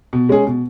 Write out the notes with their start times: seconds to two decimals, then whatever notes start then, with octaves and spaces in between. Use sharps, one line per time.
0.13 B2
0.29 G#3 C#4 G#4
0.47 B2